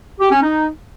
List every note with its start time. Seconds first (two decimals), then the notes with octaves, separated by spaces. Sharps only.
0.20 G4
0.31 C#4
0.43 D#4